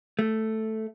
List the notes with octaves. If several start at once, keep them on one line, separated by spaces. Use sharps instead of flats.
A3